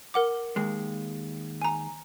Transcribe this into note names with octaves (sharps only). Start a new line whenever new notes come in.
A#4 F#5 D6
D#2 G#3
G#5 A#5